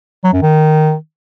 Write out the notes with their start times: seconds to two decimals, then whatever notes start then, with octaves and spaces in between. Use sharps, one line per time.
0.24 F#3
0.33 F#2
0.42 D#3